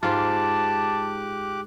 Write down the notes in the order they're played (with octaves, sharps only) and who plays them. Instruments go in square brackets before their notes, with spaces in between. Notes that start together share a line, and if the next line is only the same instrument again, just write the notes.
[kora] G#2 F4 [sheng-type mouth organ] G4 D6 F#6 [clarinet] A5